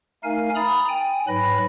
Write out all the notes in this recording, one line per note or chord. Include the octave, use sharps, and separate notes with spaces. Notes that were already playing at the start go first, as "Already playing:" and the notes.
A3 D#4 A#4 F5 G#5
A#5 B5 D#6 A6
G5 G#5
G#2 F#3 B4 B5 A#6